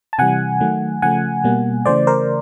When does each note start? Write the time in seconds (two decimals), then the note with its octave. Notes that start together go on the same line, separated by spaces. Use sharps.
0.13 A5
0.18 C3 E3 G3 F#5 G#5
0.60 D#3 F#3 A3
1.02 C#3 F3 A3 F#5 G#5
1.44 B2 G3 A#3
1.85 C#3 E3 A3 C5 D5
2.07 A#4 C5